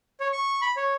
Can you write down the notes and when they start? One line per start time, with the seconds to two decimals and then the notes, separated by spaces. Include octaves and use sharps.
0.20 C#5
0.33 C#6
0.62 B5
0.77 C#5